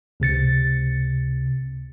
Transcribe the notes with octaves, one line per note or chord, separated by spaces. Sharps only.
C#2 C3 A6 C#7